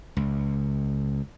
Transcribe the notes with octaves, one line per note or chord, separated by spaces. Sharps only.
C#2